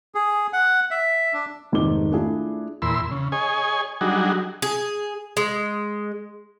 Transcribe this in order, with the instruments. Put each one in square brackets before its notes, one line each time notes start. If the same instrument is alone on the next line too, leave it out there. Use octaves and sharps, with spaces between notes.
[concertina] G#4
F#5
E5
D4
[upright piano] F1 G#2 C3 D#3 D6 G7
A3 D4 E4 F4 G#4
[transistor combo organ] E2 A#2 B5 C6 E6
C#3
G#4 C#5 D#5 G#5
F#3 G3 D4 D#4 F#4 G#4
[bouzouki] G#4
G#3